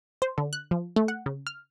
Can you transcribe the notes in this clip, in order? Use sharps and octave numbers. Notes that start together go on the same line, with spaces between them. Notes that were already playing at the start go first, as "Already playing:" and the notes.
C5
D3
F#6
F3
A3
F#5
C#3
F6